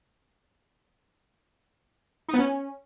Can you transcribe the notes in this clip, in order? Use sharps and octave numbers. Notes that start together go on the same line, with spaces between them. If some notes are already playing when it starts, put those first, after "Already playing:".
D#4
B3
C#4